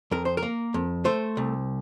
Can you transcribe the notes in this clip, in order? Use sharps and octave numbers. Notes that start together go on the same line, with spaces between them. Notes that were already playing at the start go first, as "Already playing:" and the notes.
F2 A#4
C5
A#4
A#3
F2
A3 C5
C2